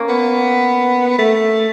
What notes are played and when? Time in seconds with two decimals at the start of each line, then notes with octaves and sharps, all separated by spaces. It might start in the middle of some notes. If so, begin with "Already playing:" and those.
Already playing: A#3 C#4
0.09 B3
1.18 A3